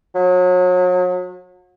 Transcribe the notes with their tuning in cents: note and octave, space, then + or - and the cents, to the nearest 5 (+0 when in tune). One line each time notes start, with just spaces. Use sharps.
F#3 -35